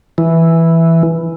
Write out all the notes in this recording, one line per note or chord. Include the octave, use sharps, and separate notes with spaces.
E3